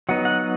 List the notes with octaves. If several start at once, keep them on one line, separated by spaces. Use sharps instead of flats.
F#3 B3 D#4 F#5
F#5